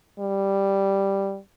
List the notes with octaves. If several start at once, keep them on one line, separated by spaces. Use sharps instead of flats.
G3